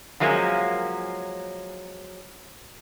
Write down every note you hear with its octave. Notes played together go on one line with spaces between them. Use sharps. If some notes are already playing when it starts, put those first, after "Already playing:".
F3 F#3 G#3 A#3 C#4